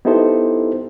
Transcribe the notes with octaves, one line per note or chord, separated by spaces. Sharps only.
B3 D#4 E4 G4 A4 C5